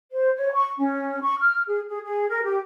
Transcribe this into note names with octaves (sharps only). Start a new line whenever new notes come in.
C5
C#5
C#6
C#4
C#6
F6
G#4
G#4
G#4
A#4
G4